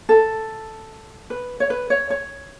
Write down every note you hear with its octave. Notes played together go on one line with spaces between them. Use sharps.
A4
B4
C#5
B4
C#5
C#5